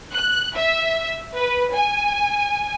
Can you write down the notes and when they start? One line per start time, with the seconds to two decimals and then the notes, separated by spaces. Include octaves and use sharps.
0.14 F#6
0.57 E5
1.37 B4
1.74 G#5